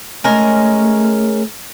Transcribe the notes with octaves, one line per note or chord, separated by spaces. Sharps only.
G#3 A3 C#4 A#4